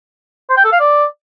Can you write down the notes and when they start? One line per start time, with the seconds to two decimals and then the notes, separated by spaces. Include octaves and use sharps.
0.49 C5
0.57 G5
0.64 A4
0.72 F5
0.80 D5